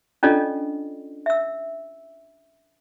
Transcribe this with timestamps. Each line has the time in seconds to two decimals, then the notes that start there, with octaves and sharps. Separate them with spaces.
0.23 C#4 D4 F4 A4 D5 D#5
1.26 E5 E6